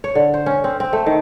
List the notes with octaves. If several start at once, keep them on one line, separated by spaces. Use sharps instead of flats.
C#5
D3
C5
C#4
C4
C4
A3
D#3